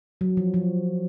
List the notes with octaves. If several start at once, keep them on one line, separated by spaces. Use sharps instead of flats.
F#3
F3
F3